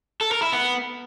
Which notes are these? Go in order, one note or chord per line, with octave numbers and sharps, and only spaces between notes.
A4
A#4
E4
B3